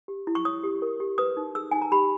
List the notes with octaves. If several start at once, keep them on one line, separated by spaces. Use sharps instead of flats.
G4
E4
C#6
C#5 D#6
G4
A#4
G4
B4 D#6
D#4
G#4 E6
D#4 G#5
A#5
G4 B5